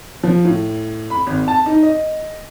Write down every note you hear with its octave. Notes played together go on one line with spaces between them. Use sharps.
F3
A2
B5
G#1
A5
D#4
D#5